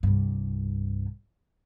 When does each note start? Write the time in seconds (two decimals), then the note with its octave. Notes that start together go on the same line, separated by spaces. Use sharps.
0.03 C2 G2